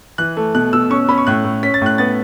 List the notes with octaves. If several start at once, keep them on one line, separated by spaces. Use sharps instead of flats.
E3 F#6
A3
B2 F#6
B2 E6
C#4 C#6
C#4 B5
C#6
A2 F#6
A2
C#4 B6
A6
A2 F#6
B3 A6